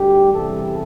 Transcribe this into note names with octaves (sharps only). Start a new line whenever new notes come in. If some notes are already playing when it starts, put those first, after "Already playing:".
Already playing: D2 D3 G3 G4
E2 C3 E3 G3 A4